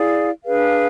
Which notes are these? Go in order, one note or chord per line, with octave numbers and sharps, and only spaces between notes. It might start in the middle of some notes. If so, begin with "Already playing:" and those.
Already playing: E4 G#4 D5 F5
D4 G#4 B4 F5